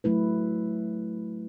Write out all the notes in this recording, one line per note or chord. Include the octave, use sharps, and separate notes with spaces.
F#3 A3 E4 B4